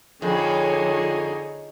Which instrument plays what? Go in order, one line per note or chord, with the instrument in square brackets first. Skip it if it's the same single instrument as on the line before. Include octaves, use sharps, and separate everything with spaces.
[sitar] F2 [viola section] D3 C#5 [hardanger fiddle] D#4 G#4